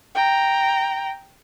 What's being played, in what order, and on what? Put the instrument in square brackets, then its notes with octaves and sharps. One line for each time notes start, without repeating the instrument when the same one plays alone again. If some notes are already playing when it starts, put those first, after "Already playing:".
[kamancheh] G5 A#5